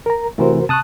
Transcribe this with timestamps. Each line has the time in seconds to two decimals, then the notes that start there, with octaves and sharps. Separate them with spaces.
0.06 A#4 A#5
0.38 C3 E3 A3 F#4 A#4 C5
0.69 C3 A5 C#6 D#6 F#6